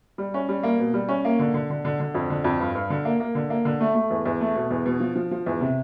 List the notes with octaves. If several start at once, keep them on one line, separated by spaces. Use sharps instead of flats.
G3
C#4
G3
A#3
B2
G3
C#4
A#3
D3
D3
D3
D3
D3
F2
D3
F2
G2
G2
D3
A#3
A#3
D3
A#3
D3
A3
A3
E2
E2
A3
B2
E2
B2
F3
F3
F3
E2
C3